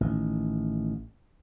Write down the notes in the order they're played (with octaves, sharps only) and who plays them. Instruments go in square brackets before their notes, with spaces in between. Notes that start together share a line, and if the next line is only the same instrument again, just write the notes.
[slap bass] A1 D#3